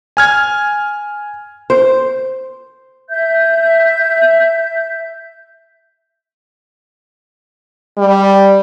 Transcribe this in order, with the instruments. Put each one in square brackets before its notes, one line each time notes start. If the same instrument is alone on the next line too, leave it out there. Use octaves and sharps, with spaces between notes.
[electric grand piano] G#5 F6 G#6
[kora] C5
[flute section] E5 G6
[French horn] G3